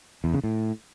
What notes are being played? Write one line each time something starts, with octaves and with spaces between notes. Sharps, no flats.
E2
C#3
A2